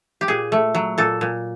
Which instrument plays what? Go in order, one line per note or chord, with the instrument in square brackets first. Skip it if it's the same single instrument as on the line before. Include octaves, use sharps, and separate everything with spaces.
[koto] G4
A#2 G#4
A3
F#3
A#2 A4
A#2